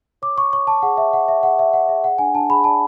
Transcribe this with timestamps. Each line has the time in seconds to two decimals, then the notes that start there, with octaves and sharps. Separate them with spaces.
0.22 C#5 D6
0.37 C#5 C#6
0.53 C#5 C#6
0.67 C#5 A5
0.82 G#4 F#5
0.98 C#5 E5
1.13 C#5 F#5
1.28 C#5 E5
1.43 G#4 F#5
1.58 C#5 E5
1.73 C#5 F#5
1.89 G#4 E5
2.04 G#4 F#5
2.19 D4 G#5
2.34 D4 A5
2.49 G#4 B5
2.64 D5 A5